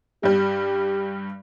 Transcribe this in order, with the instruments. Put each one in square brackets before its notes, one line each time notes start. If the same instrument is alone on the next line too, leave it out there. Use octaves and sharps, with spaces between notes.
[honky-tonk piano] G2 G3 [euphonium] G4